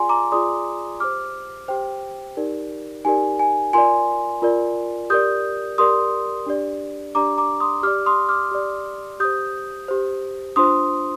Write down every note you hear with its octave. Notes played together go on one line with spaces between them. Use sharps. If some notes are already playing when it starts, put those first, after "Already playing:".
Already playing: F4 G#4 D5 G#5 C6
A#5 D6
F4 G#4 D5 C6 D#6
G4 C5 D6 F6
G4 C5 G5
D#4 G4 A#4 D5
D#4 G4 A#4 D5 G#5
G#5
F4 A#4 D5 G#5 C6
F4 A#4 D5
G4 A#4 D5 D#6 G6
G4 A#4 D5 C6 D#6
D4 G4 D5
D4 G4 D5 A#5 D6
A#5 D6
C6 D#6
G4 D5 D6 F6
C6 D#6
D6 F6
G4 D5
G4 C5 D#6 G6
G4 C5
D4 F4 C5 C6 D#6